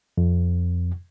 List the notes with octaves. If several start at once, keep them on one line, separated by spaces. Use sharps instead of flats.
F2